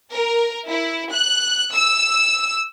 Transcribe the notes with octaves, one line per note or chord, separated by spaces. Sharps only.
A#4
E4
F#6
E6